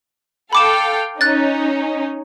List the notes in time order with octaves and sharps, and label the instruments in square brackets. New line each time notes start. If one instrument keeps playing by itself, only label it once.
[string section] A4 F5 G5 [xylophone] B5 D6 E7
[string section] C#4 D#4 [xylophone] F#6 A6